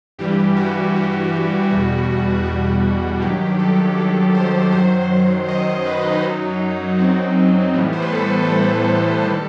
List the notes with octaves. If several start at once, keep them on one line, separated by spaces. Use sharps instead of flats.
G2 E3 G3 G4
F#4
G2 E3 G3
E2 B2 G3
E2 B2 G3 F#4
G2 D#3 F#3 G4
A4
G2 D#3 F#3
C5
F#2 D#3 F#3 C5
F#2 D#3 F#3 D#5
C5
B4
D#4
F#2 F#3
F#2 F#3 C4
A2 E3 G3 B3
C5
B4
A4
A4
A2 E3 G3 B4
D#3 G3 A4